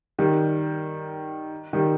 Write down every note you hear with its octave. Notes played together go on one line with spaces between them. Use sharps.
D#3 G3
D#3 G3